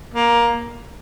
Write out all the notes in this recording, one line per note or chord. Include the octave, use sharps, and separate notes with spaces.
A#3